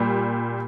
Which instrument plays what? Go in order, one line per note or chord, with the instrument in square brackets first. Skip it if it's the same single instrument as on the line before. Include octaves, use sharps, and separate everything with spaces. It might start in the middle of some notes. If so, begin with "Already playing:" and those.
Already playing: [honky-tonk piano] A#2 G3